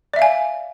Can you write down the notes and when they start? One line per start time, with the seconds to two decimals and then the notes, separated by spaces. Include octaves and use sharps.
0.14 D5
0.16 E5
0.19 F5
0.22 G#5